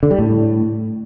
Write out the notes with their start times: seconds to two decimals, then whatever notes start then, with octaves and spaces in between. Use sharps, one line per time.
0.03 D3
0.11 G3
0.19 A2